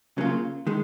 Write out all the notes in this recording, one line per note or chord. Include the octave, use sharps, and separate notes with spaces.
C#3 F#3 A#3 F4
D#3 G#3